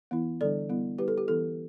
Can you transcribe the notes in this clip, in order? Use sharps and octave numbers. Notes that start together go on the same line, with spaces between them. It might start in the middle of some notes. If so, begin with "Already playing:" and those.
E3 B3 E4
D3 G3 D4 A4 D5
G3 B3 E4
G3 E4 G4 B4
A4
G4
E3 B3 E4 A4